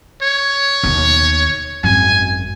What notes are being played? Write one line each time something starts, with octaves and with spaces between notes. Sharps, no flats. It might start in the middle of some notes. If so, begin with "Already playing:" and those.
C#5
D#2 B2
G#1 F#2 G#5